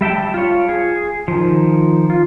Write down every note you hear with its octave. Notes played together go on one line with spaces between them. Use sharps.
G3 E5 G5 A5
F4 C#5
G#4
D#3 F3
F4